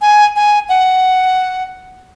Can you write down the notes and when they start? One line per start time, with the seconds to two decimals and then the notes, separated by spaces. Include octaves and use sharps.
0.02 G#5
0.36 G#5
0.69 F#5